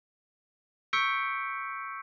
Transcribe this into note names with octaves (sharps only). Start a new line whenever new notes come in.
C#6 E6 G6 B6 C#7 D7